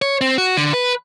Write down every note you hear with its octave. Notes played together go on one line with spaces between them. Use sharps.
C#5
C4
F#4
D3
B4